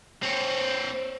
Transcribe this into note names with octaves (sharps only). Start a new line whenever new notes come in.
C4 C#5